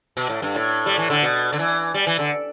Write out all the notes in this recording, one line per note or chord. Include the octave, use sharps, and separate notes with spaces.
B2
A2
G2
A2
G3
E3
D3
B2
D3
E3
G3
E3
D3